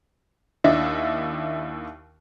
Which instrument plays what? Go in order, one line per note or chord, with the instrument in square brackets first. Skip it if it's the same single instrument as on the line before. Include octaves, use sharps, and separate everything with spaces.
[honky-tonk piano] D#2 D4 E4 D#5 E5